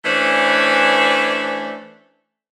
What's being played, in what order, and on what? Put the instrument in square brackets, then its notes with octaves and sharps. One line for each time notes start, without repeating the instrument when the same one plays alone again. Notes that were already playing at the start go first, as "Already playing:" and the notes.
[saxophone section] E3 A3 C#4 D4 B4 C5